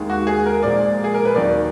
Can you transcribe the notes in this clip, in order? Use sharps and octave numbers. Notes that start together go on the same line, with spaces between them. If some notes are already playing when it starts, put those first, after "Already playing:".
Already playing: D#2 D#3 G#3
F#4
G#4
A#4
A#2 F3 G#3 D5
G#4
A#4
B4
D#2 D#3 F#3 D5